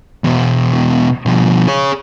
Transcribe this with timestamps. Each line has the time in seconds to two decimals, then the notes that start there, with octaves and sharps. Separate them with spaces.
0.24 E2 B2
1.26 B2 F3
1.68 G#4 C#5